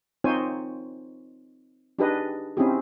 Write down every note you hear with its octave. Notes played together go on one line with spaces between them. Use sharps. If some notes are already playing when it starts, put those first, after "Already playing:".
C4 D#4 F4 C5 C#5 G#5
D4 D#4 G4 G#4 B4 D#5
C4 C#4 D#4 E4 G4 G#4